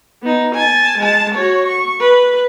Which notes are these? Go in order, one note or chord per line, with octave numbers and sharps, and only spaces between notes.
B3 D#4
G#5 A5
G#3 A5
F#4 C#5
C#6
B4